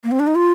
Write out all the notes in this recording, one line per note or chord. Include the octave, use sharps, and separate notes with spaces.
A#3
C4
D4
D#4
F4